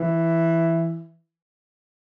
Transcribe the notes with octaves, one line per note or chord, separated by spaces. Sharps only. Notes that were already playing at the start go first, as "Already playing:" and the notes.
Already playing: E3